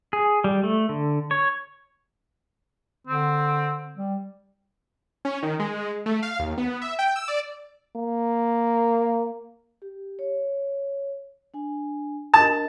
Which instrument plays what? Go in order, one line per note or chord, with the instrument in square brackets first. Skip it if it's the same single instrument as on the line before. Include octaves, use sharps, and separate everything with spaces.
[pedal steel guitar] G#4
G3
A3
D3
C#5
[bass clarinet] D3 [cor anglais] C4
[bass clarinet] G3
[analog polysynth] C#4
D#3
G#3
A3
F5
D#2
B3
E5
G5
E6
D5
[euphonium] A#3
[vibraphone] G4
C#5
D4 G#5
[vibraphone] D4 A#4 D#5 [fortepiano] A5